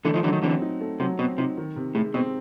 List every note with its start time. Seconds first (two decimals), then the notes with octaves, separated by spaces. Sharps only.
0.04 D3 E3 A3
0.14 D#3 F3
0.23 D3 E3 F#3
0.33 D#3
0.42 D3 E3 C4
0.61 D#4
0.81 A3
1.00 C3 F#3
1.19 B2 C4
1.38 C3 D#4
1.57 D#3
1.76 C3
1.95 A2 G#3
2.14 B2 C4